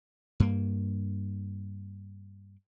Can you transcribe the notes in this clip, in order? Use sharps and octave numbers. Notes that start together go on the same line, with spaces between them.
G2 A#3